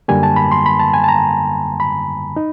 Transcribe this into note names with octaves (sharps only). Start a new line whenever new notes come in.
F#2 D3 G3 A#3 G#5
A5
B5
C6
B5
A5
G#5
A5
A#5
B5
D#4